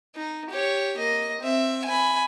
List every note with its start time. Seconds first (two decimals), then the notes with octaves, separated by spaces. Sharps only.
0.16 D#4
0.50 G4 C#5
0.98 A#3 D#5
1.41 C4 E5
1.85 G#5 B5